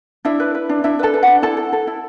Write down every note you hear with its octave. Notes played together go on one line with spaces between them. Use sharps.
D4 E4 E5
B4
B4
D4
D4 E4 E5
A4 B4 A5
B4
F#4 F#5
D4
E4 A4 A5
A4
A4
E4